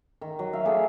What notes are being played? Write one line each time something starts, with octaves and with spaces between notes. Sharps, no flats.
D#3
F#3
E5 F5
A3 D4 G#4 E5